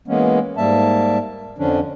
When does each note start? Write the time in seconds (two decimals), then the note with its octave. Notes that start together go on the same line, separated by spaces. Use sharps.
0.08 E3 G#3 A#3 B3 C#4
0.57 G#2 G3 A#3 E5 A5
1.58 F2 D3 F3 C#4 D4